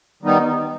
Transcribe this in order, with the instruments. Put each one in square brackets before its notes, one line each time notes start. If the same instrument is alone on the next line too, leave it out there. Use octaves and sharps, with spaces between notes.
[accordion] D#3 G3 B3 D#4